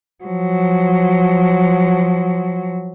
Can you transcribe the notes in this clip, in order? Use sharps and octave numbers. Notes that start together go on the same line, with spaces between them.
F3 F#3